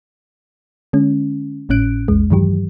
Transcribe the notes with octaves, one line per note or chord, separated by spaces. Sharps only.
D3 G#3 C#4
G#1 A2 C#4 F#6 D7
A#1 E2 G#3
G2 D#3 E3 F#3 G4